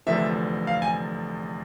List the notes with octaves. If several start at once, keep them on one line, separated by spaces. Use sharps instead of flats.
F1 E2 D3 F3 E5
F5
G#5